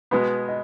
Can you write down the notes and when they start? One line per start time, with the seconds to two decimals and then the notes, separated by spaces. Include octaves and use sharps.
0.11 B2 G#3 B3 B4
0.48 D#5